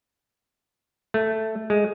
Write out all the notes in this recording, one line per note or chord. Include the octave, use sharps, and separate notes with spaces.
A3
G#3